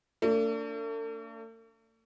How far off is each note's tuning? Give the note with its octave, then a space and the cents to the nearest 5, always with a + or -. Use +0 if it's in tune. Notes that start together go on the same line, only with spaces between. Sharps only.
A3 +45 D4 -20